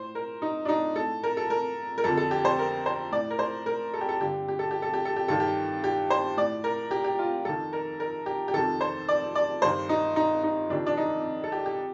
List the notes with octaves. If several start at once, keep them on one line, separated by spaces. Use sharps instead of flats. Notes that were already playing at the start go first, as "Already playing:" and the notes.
Already playing: A2 C5
A#4
D#4
D4
D#4
A2 A4
A#4
A4
A#4
A#4
F2 D3 A4
A4
G4
C5
A#4
C5
A2 D5
A#4
C5
A#4
A4
G4
A4
G2 D3 G4
G4
A4
G4
A4
G4
A4
G4
G2 D#3 A4
G4
G4
C5
A2 D5
A#4
G4
G4
F4
F2 D#3 A4
A#4
A#4
G4
G4
F2 C3 D#3 A4
C5
D5
D5
G2 D#3 C5
D#4
D#4
D#4
F2 C3 D#3 D4
D4
D#4
A4
G4
G4